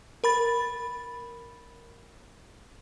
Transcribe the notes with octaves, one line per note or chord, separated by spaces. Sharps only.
A#4 B5 A6